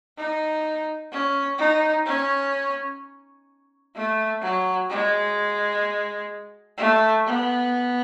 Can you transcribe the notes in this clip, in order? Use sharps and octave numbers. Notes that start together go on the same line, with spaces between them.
D#4
C#4
D#4
C#4
A3
F#3
G#3
A3
B3